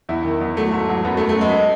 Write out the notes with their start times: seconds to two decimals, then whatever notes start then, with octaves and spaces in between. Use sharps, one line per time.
0.09 E2 E4
0.25 D#3
0.41 E2
0.57 F#3 A3
0.73 G#2
0.89 F#3
1.05 F#2 B3
1.17 A3
1.21 F#2
1.29 A3
1.37 F#2 G#3